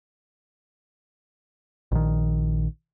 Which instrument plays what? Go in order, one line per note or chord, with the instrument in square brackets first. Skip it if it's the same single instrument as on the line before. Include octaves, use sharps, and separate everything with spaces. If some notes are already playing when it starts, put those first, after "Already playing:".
[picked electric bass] A#1 D#3